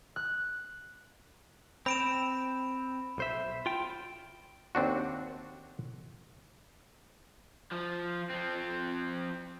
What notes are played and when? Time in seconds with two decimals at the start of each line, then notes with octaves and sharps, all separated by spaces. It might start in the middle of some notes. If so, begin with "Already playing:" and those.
0.16 F#6
1.86 C4 B5 D7 E7
3.18 B1 C5 E5
3.66 F4 G5
4.75 D#2 C4 D4 F#4
7.72 F3
8.30 F3 C4